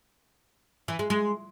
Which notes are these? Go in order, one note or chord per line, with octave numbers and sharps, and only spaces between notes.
E3
G#3
G#3